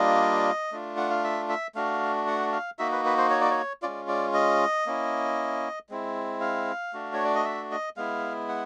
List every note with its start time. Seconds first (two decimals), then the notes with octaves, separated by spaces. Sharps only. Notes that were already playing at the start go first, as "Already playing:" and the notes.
Already playing: G3 A#3 D4 F4 D#5
0.72 A3 D4 F4
0.97 F#5
1.10 F5
1.24 E5
1.49 E5
1.75 A3 D4 F#4 F5
2.27 F#5
2.52 F5
2.79 A#3 D#4 F#4 E5
2.92 B4
3.05 B4
3.18 C5
3.30 C#5
3.41 D5
3.51 C#5
3.82 G#3 C#4 F4 D5
4.08 D5
4.34 D#5
4.86 A#3 C#4 E4
5.89 G#3 C4 E4
6.41 F5
6.93 A3 D4 F#4
7.14 C#5
7.24 D5
7.35 D#5
7.44 E5
7.71 D#5
7.97 G#3 B3 E4 F5
8.49 F#5